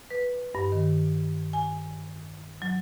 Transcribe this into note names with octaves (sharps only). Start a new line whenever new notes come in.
B4
G2
D#3
G#5
F#3